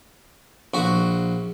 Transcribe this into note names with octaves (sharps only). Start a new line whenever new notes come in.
A#1 F#4